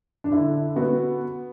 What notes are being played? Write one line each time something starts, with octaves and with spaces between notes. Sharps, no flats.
D4
D3 E4
B3 F#4